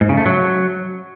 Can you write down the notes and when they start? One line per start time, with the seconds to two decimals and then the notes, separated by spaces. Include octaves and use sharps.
0.01 G#2
0.09 C#3
0.17 A3
0.26 F#3